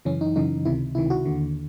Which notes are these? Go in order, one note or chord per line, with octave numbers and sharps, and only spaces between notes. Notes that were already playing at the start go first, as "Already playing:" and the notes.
F#2 C#3 E3 C#4
D#4
F#2 C#3 E3 D#4
C#2 C3 D#3 E4
C#2 C3 D#3 E4
F#4
D#2 D3